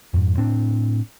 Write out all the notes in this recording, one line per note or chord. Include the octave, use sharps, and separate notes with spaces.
F2 G#2
A2 C4 D4